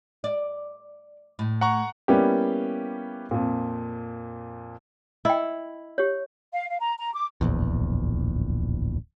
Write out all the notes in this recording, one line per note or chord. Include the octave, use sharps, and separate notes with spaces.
D5
A2
F#5 A#5 C#6
G3 A#3 B3 C#4 E4 G4
F2 A#2
E4 D#5 G5
G4 C#5
F5
F5
A#5
A#5
D6
D1 A#1 E2